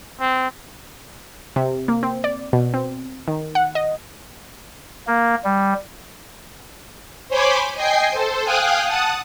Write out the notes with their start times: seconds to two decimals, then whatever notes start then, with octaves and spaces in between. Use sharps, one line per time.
0.20 C4
1.56 C3
1.88 A#3
2.03 C4
2.24 D5
2.53 B2
2.74 C4
3.28 D#3
3.55 F#5
3.75 D#5
5.07 A#3
5.44 G3
7.29 C5 C#5 G#5 B5 C6 D6
7.75 D#5 G5 G#5 C7
8.11 A4 C5
8.44 F5 G5 G#5 D#6 F#6
8.85 F#5 A5 D#6